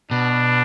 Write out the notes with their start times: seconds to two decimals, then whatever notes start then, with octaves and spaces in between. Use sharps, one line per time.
0.11 B2 D4